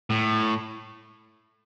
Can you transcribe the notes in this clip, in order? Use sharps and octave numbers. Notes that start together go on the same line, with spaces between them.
A2